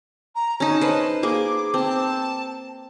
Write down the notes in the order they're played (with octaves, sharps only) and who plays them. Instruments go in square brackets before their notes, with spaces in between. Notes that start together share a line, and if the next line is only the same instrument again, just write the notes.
[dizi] A#5
[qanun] C#4 D#4 [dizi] A5
[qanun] B4 C5
[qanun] A#3 G#4 [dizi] D6
[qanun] C4 [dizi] A5